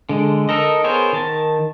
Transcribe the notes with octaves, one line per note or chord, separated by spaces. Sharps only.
D3 G#3
D#4 A4 A#4 D#5
B3 G#4 A#4 C5 C#5
D#3 A5